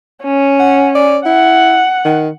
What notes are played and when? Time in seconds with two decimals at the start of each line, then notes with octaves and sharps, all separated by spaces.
0.24 C#4
0.60 F#5
0.95 D5
1.26 E4 F#5
2.05 D#3